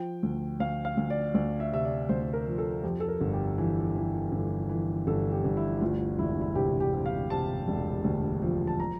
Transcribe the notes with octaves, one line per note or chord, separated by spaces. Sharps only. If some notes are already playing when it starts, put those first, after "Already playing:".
Already playing: F3 G5
D2
D2 F5
F5
D2
D5
D2 D5
E5
C3 E5
D5
D2 C5
A#4
F3
A4
F2 G4
A4
A#4
G1
G4
E3
E3
G1
E3
G1 A4
G4
G1
E4
E4
D2 F4
E1 E4
E4
C3 G4
G4
C3
F5
C3 A5
E1
D2
F3
A5
A#5